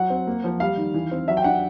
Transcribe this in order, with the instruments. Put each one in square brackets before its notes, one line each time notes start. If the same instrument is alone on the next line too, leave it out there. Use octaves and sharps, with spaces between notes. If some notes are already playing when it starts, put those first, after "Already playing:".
Already playing: [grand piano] F#3 F#5
C4
A#3
F3
G3 F5
D#3
E3
C4
F#3 E5
G5
D4 F#5